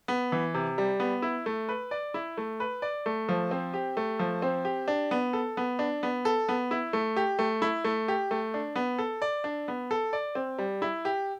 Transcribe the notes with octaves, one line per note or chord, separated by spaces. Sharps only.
B3
E3
C3
G3
B3
E4
A3
B4
D5
E4
A3
B4
D5
A3
F3
C4
G4
A3
F3
C4
G4
D4
B3
A4
B3
D4
B3
A4
B3
E4
A3
G4
A3
E4
A3
G4
A3
D4
B3
A4
D5
D4
B3
A4
D5
C4
G3
E4
G4